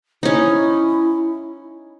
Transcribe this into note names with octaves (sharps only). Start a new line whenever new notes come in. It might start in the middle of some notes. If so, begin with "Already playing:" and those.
C#4 D#4 E4